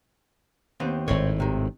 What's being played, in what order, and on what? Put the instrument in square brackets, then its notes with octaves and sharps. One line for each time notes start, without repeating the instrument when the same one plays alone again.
[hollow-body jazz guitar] D#2 B3 C4
[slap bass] G#1 A2 [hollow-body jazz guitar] C4 C#5
[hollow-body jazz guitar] C3 D#3